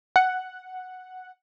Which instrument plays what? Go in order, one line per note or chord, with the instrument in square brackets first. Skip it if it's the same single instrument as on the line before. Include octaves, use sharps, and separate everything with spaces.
[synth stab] F#5